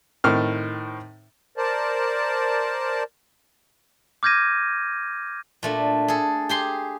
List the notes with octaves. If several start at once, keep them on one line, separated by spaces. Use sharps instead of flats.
A2 D#3 C4 F6
A#4 C5 D5 A5
D6 F6 G6 G#6 A#6 D#7
A#2 A3 D4
G#4 A4
G4 G#4 C6